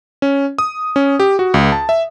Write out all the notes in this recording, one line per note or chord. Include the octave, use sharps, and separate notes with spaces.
C#4
D#6
C#4
G4
F#4
C#2
A5
E5